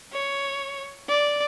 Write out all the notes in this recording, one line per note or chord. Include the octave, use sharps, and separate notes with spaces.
C#5
D5